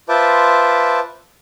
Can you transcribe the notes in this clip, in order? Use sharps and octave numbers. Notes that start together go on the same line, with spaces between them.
F4 B4 C5 E5 A5 D6